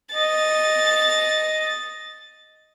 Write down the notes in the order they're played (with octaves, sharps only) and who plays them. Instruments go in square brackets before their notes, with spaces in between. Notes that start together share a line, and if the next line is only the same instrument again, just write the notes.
[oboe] D#5 [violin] A6